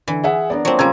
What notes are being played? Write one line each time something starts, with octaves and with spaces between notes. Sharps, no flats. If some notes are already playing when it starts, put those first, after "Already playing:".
D3 E3
G#4 E5 F#5
B3 D4 A#4 D5
F3 F#3 A#3 C4
C#3 G3 C#4 F4 C5 A#5 E6 G#6